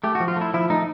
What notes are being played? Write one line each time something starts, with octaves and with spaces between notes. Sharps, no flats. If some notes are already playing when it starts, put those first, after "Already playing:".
A3 G4
F#4
F3
F4
A3
E4
F3 E4
A3 D#4